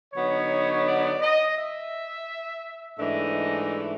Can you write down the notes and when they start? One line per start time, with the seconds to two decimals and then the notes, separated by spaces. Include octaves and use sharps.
0.14 D3 F#3 B3 D#4 C#5
0.86 D5
1.21 D#5
1.56 E5
2.98 G#2 E3 A3 D4 D#5